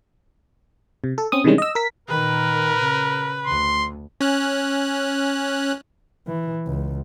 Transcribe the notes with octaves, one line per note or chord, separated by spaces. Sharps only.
C3
A4
C4 C#4 D#6
C3 D#3 E3 G3 G#3 C#4
D#5 E6
A#4 B6
A#2 D#3 A#4 B4
C#3
D2 C6
C#4 F#6
E3
C#2